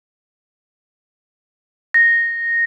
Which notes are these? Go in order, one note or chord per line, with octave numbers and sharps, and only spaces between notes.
A#6